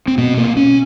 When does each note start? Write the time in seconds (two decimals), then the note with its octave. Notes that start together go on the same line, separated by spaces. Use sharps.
0.08 C4
0.18 B2 B3
0.37 A#3
0.56 C#4